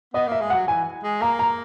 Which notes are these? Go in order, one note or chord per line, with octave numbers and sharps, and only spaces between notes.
B3 D#5
A#3 E5
G#3
F#5
F#3
E3 G#5
G#3
A#3 A#5
A#5